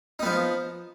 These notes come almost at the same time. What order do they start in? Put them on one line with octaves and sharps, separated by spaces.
D#4 B3 F3